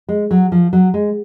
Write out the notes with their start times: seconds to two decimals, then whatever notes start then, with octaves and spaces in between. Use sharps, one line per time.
0.09 G#3
0.31 F#3
0.52 F3
0.73 F#3
0.94 G#3